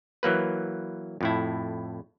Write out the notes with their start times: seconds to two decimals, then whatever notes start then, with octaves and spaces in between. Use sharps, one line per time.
0.23 E3 F#3 A#3 B4
1.21 F2 A2 E4